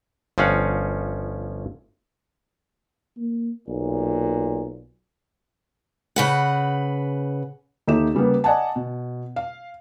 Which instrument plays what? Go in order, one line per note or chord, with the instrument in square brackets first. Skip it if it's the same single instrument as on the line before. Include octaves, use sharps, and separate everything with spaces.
[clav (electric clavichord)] G1 F3 C#4 F5 F#5
[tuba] A#3
[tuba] B1 [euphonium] A#2
[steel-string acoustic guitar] C#3 B4 F#5
[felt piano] D#2 D#4 G4 A4 E5 E7
C#3 G3 A#3 B3
D5 D#5 F#5 G#5 A5
B2
F5